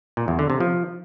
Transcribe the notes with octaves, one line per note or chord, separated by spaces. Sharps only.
A#2
E2
D3
C3
F3